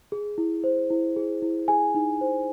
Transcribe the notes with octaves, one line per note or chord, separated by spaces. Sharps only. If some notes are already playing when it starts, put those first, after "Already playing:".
G#4
E4
C5
E4
G#4
E4
G#4 G#5
D#4
C5